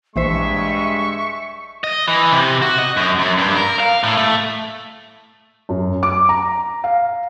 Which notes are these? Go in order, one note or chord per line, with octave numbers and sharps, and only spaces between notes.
A#1 G2 E3 G#3 C5 E5 C#6
D#5
E3
C3
F#4
D#5
F#2
F#2
G2
A#4
F5
A2
A3
F#2
D6
A#5
F5